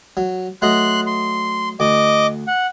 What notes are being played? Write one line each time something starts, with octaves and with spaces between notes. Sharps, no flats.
F#3
F#3 A3 D#5 C6 F#6
C6
D2 D#5 D6
F#5